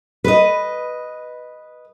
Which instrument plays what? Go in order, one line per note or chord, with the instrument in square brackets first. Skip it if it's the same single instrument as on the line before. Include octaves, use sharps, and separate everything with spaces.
[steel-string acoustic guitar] B4 D#5